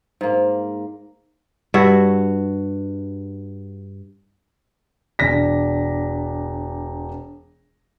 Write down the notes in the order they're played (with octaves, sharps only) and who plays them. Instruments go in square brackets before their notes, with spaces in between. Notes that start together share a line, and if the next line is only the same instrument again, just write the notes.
[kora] G#2 A#3
G2 F#4 C#5 E5
[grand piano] E1 D4 A#6 B6